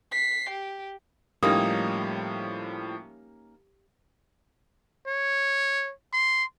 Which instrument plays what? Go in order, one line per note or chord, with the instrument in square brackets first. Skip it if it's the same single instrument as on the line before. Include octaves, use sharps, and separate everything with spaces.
[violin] B6 C7
G4
[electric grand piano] A2 F3 G3 [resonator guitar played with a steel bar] A#3 C#4 D#4 [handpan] G4 [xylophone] D#6
[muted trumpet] C#5
C6